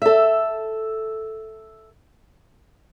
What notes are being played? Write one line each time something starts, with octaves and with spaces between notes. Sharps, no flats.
A4 E5